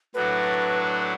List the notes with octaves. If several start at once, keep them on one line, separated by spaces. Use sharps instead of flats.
A2 F#3 A3 D4 F#4 B4